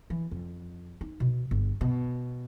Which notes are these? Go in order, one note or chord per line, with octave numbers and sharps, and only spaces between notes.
E3
F2
D#4
B2
G1
B2